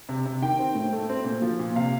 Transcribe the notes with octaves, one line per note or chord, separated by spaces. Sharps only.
C3
C3
D#3 G5
C4
A2
A3
C4
A#2
F3
A#2
C3 F5